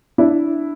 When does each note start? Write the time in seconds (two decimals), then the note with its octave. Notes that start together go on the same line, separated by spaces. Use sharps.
0.18 D4 E4